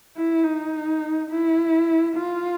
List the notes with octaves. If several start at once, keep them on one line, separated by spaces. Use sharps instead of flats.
E4
D#4
E4
F4